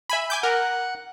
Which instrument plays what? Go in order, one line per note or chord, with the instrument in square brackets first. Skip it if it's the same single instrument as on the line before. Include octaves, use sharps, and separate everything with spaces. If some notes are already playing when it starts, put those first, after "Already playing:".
[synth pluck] E5 G#5 B5
G#5 D6 G6
[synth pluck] A#4 [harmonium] F#5